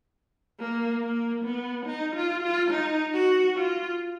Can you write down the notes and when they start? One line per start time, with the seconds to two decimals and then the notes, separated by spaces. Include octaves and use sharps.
0.60 A#3
1.02 A#3
1.44 B3
1.86 D#4
2.16 F4
2.43 F4
2.71 D#4
3.13 F#4
3.56 F4